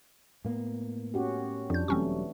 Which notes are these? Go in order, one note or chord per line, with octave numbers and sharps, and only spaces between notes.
A2 A#3 B3
C#4 F#4 G4
F2 F3 D4 G6
E1 E3 F#3 G3 A3 C4 C#4 C#6